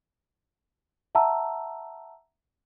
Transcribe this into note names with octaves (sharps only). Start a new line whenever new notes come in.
E5 F#5 A5 A#5 E6